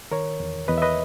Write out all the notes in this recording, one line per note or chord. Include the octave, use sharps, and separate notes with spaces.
D#3 A#4 C#5
E2
E2 B4 D#5
E5
B4 D#5